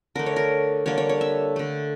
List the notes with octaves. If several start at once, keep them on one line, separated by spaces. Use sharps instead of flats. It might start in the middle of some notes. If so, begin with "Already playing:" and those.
D3 A3 A#4
C#5
A#4
D3 G3 A#3 C#5
C#5
C#5
E5
D3 A3